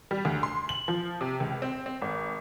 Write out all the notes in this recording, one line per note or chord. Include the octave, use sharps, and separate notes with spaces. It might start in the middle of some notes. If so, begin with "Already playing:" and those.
G3
D2
C6
F#7
F3
C3
C#2
C4
C4
G#1